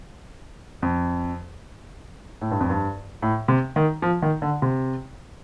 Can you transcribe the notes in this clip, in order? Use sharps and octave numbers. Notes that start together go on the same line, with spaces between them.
F2
A2
G2
F2
G2
A2
C3
D#3
F3
D#3
D3
C3